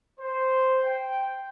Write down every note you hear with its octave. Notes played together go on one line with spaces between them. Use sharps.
C5
G5